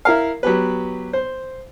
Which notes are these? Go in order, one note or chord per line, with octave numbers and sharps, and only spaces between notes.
E4 A#4 F5
F#3 B3 G4 B4
C5